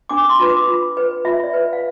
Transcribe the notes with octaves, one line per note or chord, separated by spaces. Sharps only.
D4 D6
C6
F4 B4
D6
F4
B4
F4 E5
D5
B4
F5